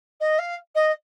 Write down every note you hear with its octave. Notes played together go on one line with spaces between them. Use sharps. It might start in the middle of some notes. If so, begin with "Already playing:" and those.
D#5
F5
D#5